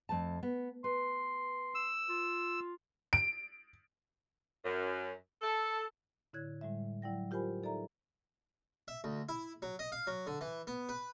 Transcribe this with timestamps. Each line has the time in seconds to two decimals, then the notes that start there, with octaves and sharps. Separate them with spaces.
0.09 F2 A3 A5
0.43 B3
0.84 B4 C6
1.75 E6
2.09 F4
3.13 D7
4.65 F#2
5.41 A4
6.33 A2 D3 E4 C#5 F#6 G#6
6.61 A2 G3 G#3 E5
7.02 F#3 E4 D5 G5 A#6
7.31 F4 G4 A#4 C5 G#5 B5
7.63 D#4 A4 D5 E5 A#5
8.88 E5
9.04 D2
9.29 E4
9.62 F#3
9.79 D#5
9.92 F5
10.07 F#3
10.27 D3
10.41 E3
10.67 B3
10.89 B4